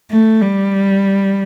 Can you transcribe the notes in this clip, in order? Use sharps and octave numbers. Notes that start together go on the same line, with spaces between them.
A3
G3